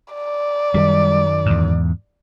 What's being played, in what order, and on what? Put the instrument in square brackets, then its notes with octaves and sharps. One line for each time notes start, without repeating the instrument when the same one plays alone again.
[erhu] D5
[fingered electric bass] F#2 D#3 [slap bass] G3
[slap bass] E2 G#2